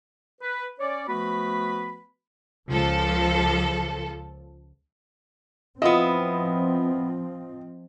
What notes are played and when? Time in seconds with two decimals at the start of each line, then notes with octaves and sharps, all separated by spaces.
0.41 B4
0.80 C#4 C#5 D5
1.08 F3 A3 B3 F#4 B4 B5
2.70 C#2 F3 A4
5.82 F3 B3 C4 E4 F4 D#5